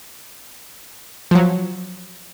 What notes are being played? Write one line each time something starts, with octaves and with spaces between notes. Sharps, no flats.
F3 F#3